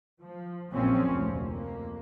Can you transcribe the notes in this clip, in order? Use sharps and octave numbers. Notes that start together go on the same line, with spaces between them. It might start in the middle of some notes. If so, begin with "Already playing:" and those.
F3
A#1 F#2 A#2 F3 C4 C#4
F1 D2
F2 A#3